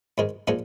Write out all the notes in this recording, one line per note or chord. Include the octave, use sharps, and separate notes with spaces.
G#2 D#3 G#3
A#2 F3 G#3 D#4